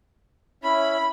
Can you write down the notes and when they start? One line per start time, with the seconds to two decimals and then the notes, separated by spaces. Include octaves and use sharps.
0.64 C#4 E4 B5